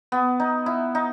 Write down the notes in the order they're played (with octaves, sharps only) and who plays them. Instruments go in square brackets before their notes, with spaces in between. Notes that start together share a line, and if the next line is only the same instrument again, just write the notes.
[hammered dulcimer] B3
D#4
E4
D#4